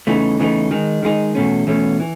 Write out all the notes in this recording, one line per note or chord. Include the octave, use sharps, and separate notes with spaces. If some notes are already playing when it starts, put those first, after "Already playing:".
E2 C#3 E3 A3 D#4
E2 C#3 E3 A3 D#4
D#3 G#3 D#4
D#3 G#3 D#4
E2 B2 A3 C#4
E2 B2 A3 C#4
E3